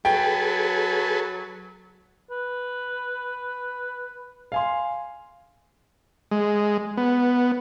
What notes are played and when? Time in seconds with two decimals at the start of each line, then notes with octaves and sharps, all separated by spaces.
0.05 F#3 G#4 A4 B4 G5
2.31 B4
4.52 F5 G#5 C6
6.31 G#3
6.97 B3